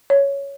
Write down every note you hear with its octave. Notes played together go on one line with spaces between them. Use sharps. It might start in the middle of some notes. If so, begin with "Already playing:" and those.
C#5